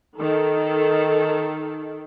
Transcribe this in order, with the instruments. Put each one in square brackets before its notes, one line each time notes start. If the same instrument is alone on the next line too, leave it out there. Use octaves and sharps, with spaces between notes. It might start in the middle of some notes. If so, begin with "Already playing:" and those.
[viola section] D#3 A4